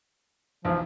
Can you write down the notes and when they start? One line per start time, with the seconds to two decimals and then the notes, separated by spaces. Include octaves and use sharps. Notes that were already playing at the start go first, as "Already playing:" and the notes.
0.65 B1 E2 F3